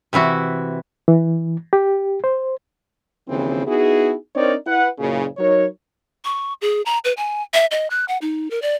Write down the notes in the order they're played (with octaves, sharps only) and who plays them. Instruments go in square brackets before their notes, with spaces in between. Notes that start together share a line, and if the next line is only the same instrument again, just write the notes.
[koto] C3 E3 E4 F#4
[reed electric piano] E3
G4
C5
[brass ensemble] D#2 C#3 E3 F3 C4
B3 D#4 E4 F#4 G#4
C4 D4 D#4 A#4 C#5 D5
E4 B4 F#5
F#1 A#2 C#3
F#3 D#4 A#4 C#5
[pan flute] C#6
G#4
A#5
B4
G#5
E5
D#5
F#6
F#5
D#4
A#4
D5